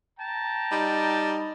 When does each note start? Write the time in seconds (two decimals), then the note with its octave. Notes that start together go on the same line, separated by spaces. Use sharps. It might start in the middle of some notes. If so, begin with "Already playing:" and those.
0.19 G5 A5 A#5
0.72 G3 D#4